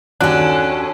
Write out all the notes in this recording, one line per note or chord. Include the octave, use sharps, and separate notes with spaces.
D#2 C#4 D4 F#4 A4 F#6